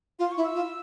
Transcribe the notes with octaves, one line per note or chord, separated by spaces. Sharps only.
F4 C6
C#6
E4
E6
F4